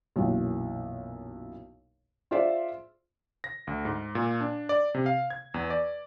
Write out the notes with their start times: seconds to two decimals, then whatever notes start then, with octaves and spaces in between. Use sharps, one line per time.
0.16 B1 F#2 A#2 E3
2.31 F4 G#4 C5 D5 E5 C6
3.44 A#6
3.67 D2
3.85 G#2
4.15 A#2
4.41 D4
4.69 D5
4.94 C3
5.06 F5
5.30 G#6
5.54 E2
5.70 D5